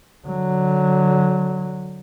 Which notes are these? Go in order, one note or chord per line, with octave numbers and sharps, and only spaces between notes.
D3 F#3